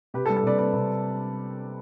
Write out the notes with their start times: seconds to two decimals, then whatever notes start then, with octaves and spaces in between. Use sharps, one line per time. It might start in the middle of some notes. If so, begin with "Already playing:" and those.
0.14 C3 G4 B4
0.26 A4
0.30 G3
0.37 A4
0.43 C3 B4 D5
0.58 C4 B4 D5
0.73 C3